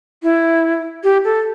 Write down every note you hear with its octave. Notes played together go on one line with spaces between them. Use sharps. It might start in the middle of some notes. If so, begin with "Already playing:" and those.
E4
G4
A4